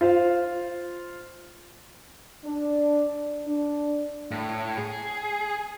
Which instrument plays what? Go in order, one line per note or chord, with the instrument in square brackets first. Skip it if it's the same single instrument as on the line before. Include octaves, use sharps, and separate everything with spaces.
[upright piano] F4 C5 F5
[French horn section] D4
D4
[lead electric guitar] A2
G#4